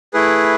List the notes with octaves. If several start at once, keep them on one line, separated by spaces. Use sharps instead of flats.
A3 E4 G#4 B4